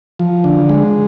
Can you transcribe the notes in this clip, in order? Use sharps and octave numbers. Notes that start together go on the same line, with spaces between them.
F3
D3
G#3